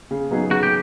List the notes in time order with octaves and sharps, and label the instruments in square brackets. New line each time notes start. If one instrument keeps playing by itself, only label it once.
[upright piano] C#3
F#3 B3 D#4 G#4
[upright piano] C#3 [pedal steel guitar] F#4
[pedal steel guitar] G4